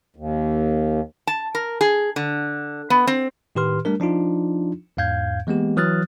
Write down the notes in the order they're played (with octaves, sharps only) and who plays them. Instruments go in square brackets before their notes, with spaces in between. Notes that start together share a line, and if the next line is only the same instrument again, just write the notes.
[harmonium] D#2
[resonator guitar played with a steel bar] A5
A#4
G#4
D3
B3
C4
[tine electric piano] A2 D#3 G4 B4 C6 F6
G3 A3 D4 A#4
F3 D4 D#4 F4
E2 G#2 F5 G6 G#6
E3 G#3 A#3 B3 G4
E3 F#3 D#6 F6 F#6 A6